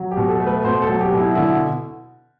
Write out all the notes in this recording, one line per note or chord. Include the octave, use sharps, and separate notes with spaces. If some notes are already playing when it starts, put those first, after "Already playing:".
Already playing: F#3
G4
B2
A4
A3
B4
B2 C5
A4
F#3
G4
B2
E4
D3 E4